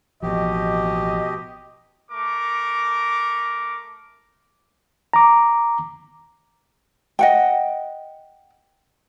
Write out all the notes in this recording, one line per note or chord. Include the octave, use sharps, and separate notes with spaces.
A1 B2 F3 G4 D#5
A3 A#4 D6
A#5 D6
D#5 F#5 G5